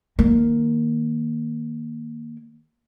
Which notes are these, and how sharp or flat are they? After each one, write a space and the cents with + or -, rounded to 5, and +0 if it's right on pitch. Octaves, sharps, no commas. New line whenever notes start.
D#3 +0 A#3 +0